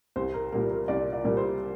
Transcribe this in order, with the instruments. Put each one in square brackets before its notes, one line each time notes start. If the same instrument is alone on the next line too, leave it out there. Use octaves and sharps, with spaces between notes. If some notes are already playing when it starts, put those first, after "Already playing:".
[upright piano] C2 C5
A#4
A#2 G3 A#3 A#4
A#4
C2 D5
D5
A#2 G3 A#3
C5